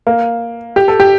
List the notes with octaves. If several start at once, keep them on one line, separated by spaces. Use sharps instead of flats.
A#3
G4
A4
G4